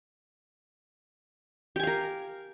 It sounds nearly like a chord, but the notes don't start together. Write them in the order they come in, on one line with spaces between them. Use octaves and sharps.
G4 G#5 F5 A#4